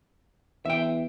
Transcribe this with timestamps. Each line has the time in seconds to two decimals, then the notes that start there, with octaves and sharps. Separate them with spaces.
0.65 E2 E5 G5